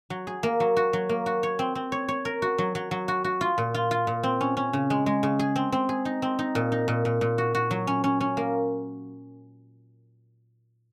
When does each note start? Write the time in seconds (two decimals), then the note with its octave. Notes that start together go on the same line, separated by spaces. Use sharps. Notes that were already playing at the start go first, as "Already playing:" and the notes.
0.10 F#3
0.27 G#4
0.43 A#3
0.60 F#3
0.77 F#4
0.93 F#3
1.09 A#3
1.26 F#4
1.43 C#5
1.59 C4
1.75 C4
1.92 C#5
2.08 C#5
2.25 A#4
2.42 F#4
2.58 F#3
2.75 F#3
2.91 F#3
3.08 F#4
3.24 F#4
3.41 F4
3.58 A#2
3.74 F4
3.91 F4
4.07 A#2
4.23 C4
4.41 C#4
4.57 C#4
4.73 C#3
4.90 G#3
5.06 G#3
5.23 C#3
5.39 G#4
5.56 C4
5.72 C4
5.89 G#4
6.05 D#4
6.22 C4
6.39 D#4
6.55 A#2
6.72 D#4
6.88 A#2
7.05 A#2
7.21 A#2
7.38 F#4
7.55 F#4
7.71 F#3
7.87 C#4
8.04 C#4
8.21 C#4
8.37 A#3